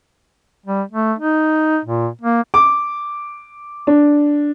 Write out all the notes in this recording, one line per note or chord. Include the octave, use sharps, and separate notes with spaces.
G3
A3
D#4
A#2
A#3
D6
D4